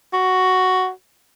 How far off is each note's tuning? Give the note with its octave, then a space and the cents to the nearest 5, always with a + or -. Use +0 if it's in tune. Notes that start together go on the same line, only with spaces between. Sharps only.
F#4 +5